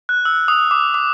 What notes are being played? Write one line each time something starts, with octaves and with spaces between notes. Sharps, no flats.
F#6
E6
D#6
D6
D6